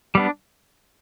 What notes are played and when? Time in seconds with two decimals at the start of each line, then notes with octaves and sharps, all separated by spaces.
0.15 G3 B3 D4